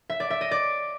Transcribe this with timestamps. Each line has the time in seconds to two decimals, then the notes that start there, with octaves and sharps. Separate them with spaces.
0.10 E5
0.20 D5
0.30 E5
0.41 D#5
0.51 D5